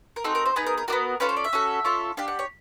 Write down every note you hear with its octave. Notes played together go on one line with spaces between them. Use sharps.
A#4
C4 D#4 F#4 A4
A#4
C5
B3 D#4 G#4 B4
A#4
A#4
B3 D4 F#4 A#4
C#4 F4 A4 B4
C5
D5
E5
C#4 F#4 A4
C#4 F4 A4
D4 G4 F5
F#5
C#5